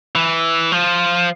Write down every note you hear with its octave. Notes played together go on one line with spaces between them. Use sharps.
E3
F3